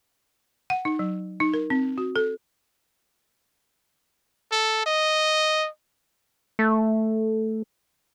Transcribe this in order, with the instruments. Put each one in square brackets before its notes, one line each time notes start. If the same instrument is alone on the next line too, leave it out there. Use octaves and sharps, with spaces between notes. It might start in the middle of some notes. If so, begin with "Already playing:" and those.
[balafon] F#5
D#4
F#3
D#4
A#4
C4
F#4
A4
[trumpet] A4
D#5
[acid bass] A3